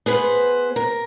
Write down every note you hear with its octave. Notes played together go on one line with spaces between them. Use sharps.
B3 G#4 B4 C5
A#4